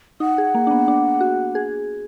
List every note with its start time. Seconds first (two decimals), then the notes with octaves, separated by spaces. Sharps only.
0.20 D#4 F#5
0.38 G#4
0.55 A#3
0.67 D4
0.71 B3
0.88 D4
1.21 F#4
1.55 G#4